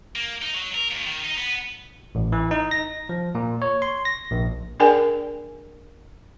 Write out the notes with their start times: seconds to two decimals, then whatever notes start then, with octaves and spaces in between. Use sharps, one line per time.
0.16 A#3
0.42 D#4
0.54 F#3
0.75 A#4
0.91 D#2
1.06 D#3
1.24 D#4
1.38 B3
2.15 A1
2.32 E3
2.51 D#4
2.71 A#6
3.09 F3
3.35 A#2
3.62 C#5
3.82 C6
4.05 A#6
4.31 A#1
4.80 D4 G#4 A#4 D5 G5 G#5